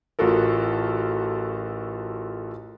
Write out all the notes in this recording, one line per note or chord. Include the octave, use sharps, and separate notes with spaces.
A1 F4 F#4 A4 A#4